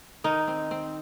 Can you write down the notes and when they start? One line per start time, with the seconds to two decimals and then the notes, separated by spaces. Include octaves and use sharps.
0.24 D#3 D#4
0.48 C4
0.71 C4